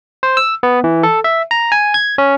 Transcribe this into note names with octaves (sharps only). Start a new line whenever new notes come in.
C5
E6
B3
E3
A4
E5
A#5
G#5
G#6
C#4